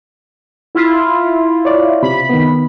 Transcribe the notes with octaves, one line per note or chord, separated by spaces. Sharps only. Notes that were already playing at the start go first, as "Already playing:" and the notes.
E4 F4
C#5 D5
C3 B5
D#3 B3